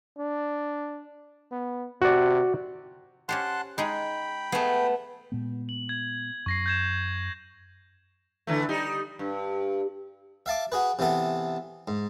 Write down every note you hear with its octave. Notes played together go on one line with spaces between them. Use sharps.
D4
B3
C3 F#4 D5
C#4 G4 C5 F#5 A5 C6
G#3 D#4 G#4 G5 B5
A3 B3 G#4
A#2 G#3 B3
F#7
G#6
F#2 C#6 A#6 C7
G6 G#6 E7
D3 E3 A3
G3 D#4
G2
E5 F5 A5 D6
F#4 G#4 B4
C3 E3 B3 A4
G#2